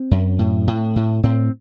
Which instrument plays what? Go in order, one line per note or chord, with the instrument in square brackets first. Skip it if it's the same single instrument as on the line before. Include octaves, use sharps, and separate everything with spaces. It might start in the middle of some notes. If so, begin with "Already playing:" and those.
Already playing: [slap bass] C4
F#2
A2
A2
A2
A2 C4